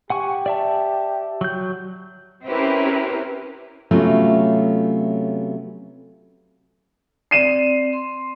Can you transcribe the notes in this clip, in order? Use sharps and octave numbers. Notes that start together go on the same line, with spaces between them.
G4 F#5 G#5 C#6
D5 E5 A5
F#3 G6
C4 C#4 E4 G4 A#4 B4
C3 F#3 A3 B3 C#4 F4
C4 D5 C7 D#7 E7
C6